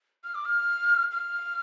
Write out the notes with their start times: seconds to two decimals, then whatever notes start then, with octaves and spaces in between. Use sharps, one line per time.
0.24 F6
0.35 D6
0.45 F6
1.11 F6